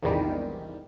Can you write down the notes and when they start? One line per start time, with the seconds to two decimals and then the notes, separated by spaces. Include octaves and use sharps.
0.02 A#1 E2 G#2 C3 D#3 G3